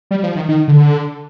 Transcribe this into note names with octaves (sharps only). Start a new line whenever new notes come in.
G3
F3
D#3
D#3
D3